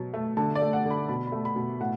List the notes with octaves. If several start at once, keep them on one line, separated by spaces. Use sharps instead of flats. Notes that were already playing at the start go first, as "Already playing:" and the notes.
Already playing: B2 F#3
A3
D3 A5
D5
A3
F#5
D3
B5
B2 B5
A3 B5
B5
B2
A2 F#5